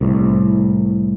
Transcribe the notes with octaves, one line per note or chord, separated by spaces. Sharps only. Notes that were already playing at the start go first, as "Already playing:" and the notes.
C2 A2